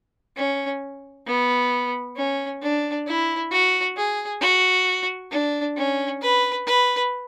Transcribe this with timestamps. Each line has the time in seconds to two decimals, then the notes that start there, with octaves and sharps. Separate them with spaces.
0.37 C#4
1.27 B3
2.16 C#4
2.62 D4
3.07 E4
3.51 F#4
3.97 G#4
4.41 F#4
5.31 D4
5.77 C#4
6.22 B4
6.67 B4